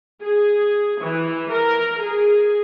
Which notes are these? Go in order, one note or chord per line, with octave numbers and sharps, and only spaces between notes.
G#4
E3
A#4
G#4